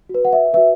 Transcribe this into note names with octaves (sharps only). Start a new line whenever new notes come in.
F#4
B4
F#5
E5
F#4 B4 E5